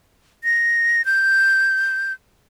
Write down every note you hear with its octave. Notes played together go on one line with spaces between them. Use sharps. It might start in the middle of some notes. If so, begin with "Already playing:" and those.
A#6
G6